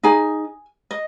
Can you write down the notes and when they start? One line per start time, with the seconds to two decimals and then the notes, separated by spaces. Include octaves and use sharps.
0.03 D#4 G#4 G#5
0.91 D#5